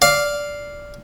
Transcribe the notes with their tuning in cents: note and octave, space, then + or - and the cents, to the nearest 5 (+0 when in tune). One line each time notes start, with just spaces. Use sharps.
D5 -10 F5 +0